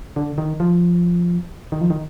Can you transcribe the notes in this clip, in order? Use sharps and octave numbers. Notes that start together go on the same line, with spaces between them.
D3
D#3
F3
D#3
F3
D#3